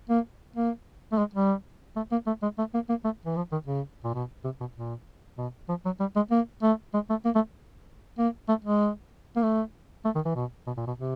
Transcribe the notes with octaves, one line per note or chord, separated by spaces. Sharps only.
A#3
A#3
A3
G#3
G3
A3
A#3
A3
G#3
A3
A#3
A#3
A3
E3
F3
D#3
C#3
A#2
B2
C3
B2
A#2
B2
F3
F#3
G3
G#3
A#3
A3
G#3
A3
A#3
A3
A#3
A3
G#3
A#3
A3
A3
D#3
E3
B2
B2
A#2
B2
C3